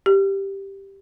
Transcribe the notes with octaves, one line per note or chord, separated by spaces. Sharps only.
G4